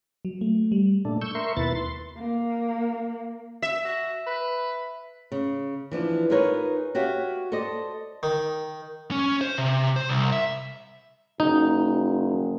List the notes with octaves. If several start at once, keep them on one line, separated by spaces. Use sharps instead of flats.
F#3
A3
G3
A#2 A3 D4
C#6 E6 G6
A#4 E5 C6 C#6
D#2 B2 E4 B4 A6
C6
A#3
E5
F#4
B4
C#3
E3 F3 D4
D#4 F4 G#4 A#4 B4 C#5
F#4 G4 C#5 E5 F5
A4 C5 D5 D#5
D#3
C#4
C5
C3
C5
C2
E5
F#1 D#4